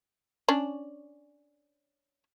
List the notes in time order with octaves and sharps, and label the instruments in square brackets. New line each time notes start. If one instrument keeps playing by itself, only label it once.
[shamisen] C#4 D4